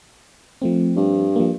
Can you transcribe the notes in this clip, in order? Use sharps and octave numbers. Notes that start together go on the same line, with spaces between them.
F3 A3 C4
G2
F3 A#3